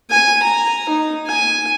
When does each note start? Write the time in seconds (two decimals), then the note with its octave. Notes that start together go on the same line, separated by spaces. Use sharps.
0.10 G#5
0.43 A#5
0.89 D#4
1.26 G#5